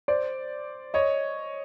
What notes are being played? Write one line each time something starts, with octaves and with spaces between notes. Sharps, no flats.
C5 D5
C#5 D#5